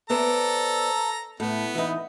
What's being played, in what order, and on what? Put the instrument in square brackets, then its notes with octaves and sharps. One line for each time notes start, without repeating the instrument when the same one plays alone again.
[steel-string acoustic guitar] B3 C5 D5 [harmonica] A4 A#5
[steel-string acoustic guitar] A2 [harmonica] B3
[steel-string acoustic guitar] E3 D#4